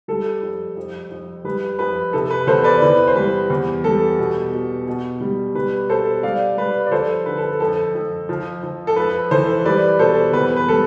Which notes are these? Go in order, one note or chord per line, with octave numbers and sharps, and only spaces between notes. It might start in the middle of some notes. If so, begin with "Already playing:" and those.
G3 A4
F2
F2
F2
G3 B4
F2 B4
C3 A4
B4
E2 A4 C5
B4 D5
E3 B4
C5
G3 B4
E2
G3 A4
B2
B2
B2
G3
G3 B4
B2 A4 C5
G3 D5 F5
G3 B4 D5
D5
F3 A4 C5
D3 B4
A4
F2 A4
F2
F3
F3
A4
F2 B4
E3 A4 C5
G3 B4 D5
B2 A4 C5
E2 B4
B4
G3 A4